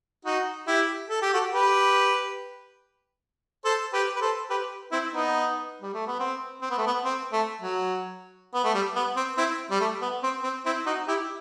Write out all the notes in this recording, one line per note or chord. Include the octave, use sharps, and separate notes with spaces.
D#4 F#4
E4 G4
A4
G4
F#4 A4
G4 B4
A4 C5
G4 B4
B4
A4 C5
G4 B4
C4 E4
B3 D#4
G3
A3
B3
C4
C4
B3
A3
B3
C4
A3
F#3
B3
A3
G3
B3
C4
C4 E4
G3
A3
B3
C4
C4
C4 E4
D#4 F#4
E4 G4